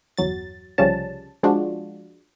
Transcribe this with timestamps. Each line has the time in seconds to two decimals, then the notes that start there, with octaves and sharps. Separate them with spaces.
0.18 G1 E2 F#3 A6
0.78 C2 C#3 F3 G3 C#4 A5
1.43 F3 G#3 D4 F4 F#4